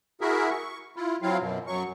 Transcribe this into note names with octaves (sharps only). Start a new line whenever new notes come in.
E4 F#4 G#4 A#4 E5
C#6
E4 F4
F#3 C4 E4 F4 F5
F#2 B2
F#2 F#3 C#6